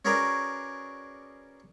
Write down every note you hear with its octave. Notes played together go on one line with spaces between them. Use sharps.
C#4 F#4 G#4 A#4 B4 D5